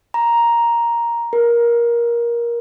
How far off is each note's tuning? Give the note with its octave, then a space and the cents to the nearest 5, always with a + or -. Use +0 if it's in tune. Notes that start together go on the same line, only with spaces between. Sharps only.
A#5 +5
A#4 +15